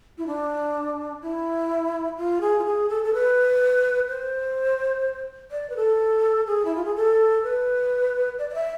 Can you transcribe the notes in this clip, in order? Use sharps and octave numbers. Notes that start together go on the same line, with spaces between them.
E4
D4
E4
F4
G#4
F4
G#4
A4
A4
B4
C5
D5
B4
A4
G#4
E4
F4
G#4
A4
B4
D5
D5
E5